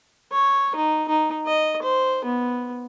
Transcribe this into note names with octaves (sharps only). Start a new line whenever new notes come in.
C#5
D#4
D#4
D#5
C5
B3